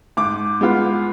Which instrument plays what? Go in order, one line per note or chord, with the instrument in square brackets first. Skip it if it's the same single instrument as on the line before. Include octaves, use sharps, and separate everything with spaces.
[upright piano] G#2 D6
G#3 B3 F4